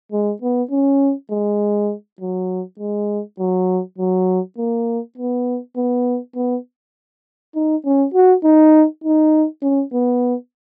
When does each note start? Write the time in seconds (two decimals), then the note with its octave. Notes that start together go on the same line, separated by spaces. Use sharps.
0.12 G#3
0.42 B3
0.71 C#4
1.31 G#3
2.21 F#3
2.80 G#3
3.39 F#3
3.98 F#3
4.58 A#3
5.18 B3
5.77 B3
6.36 B3
7.55 D#4
7.85 C#4
8.14 F#4
8.44 D#4
9.04 D#4
9.63 C#4
9.93 B3